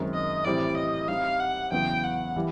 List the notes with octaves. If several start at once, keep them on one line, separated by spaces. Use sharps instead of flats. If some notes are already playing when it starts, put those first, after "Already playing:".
Already playing: F#2 D#3 G#3 C4
D#5
A2 E3 G3 C4 D5
D#5
G3 C4 D#4 F5
F#5
E2 C#3 F#3 B3 E4 G5
F#5
E3 G3